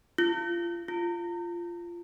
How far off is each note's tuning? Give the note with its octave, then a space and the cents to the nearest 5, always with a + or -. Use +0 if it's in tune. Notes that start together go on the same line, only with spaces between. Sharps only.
F4 -30
F4 -15